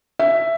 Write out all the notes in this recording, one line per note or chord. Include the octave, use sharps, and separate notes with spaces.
E5